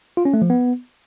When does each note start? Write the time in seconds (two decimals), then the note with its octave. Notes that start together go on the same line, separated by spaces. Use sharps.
0.17 F4
0.25 C#4
0.34 A3
0.42 F3
0.50 B3